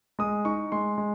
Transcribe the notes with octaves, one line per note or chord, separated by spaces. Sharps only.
G#3 D#6
D#4 C#6
G#3 C6
G#3